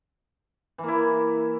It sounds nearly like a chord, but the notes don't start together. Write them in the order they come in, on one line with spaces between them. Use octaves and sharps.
E3 A#3 E4